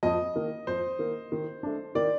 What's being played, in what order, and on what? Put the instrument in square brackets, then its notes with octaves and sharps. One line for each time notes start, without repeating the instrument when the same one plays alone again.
[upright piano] F2 [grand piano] D#5
[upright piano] D#3 A#3
[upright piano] F2 [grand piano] C5
[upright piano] D#3 A#3
D#3
A3 D4
[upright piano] D#3 [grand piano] D5